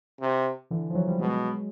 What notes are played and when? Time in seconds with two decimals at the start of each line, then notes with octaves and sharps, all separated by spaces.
0.20 C3
0.71 D3 E3
0.90 F3
0.95 E3 F#3
1.07 F3 G3
1.20 B2 F#3 G#3